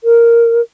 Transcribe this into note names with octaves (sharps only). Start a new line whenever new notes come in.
A#4